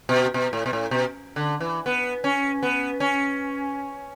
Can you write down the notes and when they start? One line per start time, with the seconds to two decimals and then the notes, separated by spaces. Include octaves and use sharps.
0.09 B2
0.34 B2
0.53 A2
0.66 B2
0.73 A2
0.91 B2
1.36 D3
1.60 E3
1.86 B3
2.24 C#4
2.63 B3
3.00 C#4